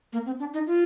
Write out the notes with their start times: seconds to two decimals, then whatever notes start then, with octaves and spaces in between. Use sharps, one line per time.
0.13 A#3
0.26 C4
0.40 D4
0.54 D#4
0.67 F4